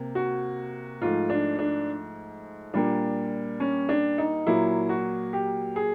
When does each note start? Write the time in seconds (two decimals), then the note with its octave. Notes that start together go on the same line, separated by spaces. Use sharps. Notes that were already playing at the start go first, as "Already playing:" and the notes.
Already playing: C3 A#3
0.15 F#4
1.01 G#2 F3 A3 F4
1.30 D4
1.59 D4
2.74 A#2 G3 A#3 D4
3.60 C#4
3.89 D4
4.18 D#4
4.46 A#2 F#3 A#3 E4
4.89 F#4
5.33 G4
5.76 G#4